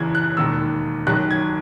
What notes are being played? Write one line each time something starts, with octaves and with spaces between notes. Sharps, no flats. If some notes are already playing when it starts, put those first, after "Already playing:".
Already playing: F#1 E2 C#3 E3 G#6
F#6
E1 D#2 D#3 E6
F#1 F#2 D#3 F#6
G#6